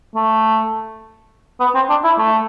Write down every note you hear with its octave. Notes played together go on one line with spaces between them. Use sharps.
A3
B3
C4
D4
E4
A3